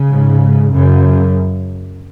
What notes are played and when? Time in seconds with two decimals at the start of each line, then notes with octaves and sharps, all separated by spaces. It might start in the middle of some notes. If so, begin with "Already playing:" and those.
Already playing: C#3
0.10 G#2
0.72 F#2 C#3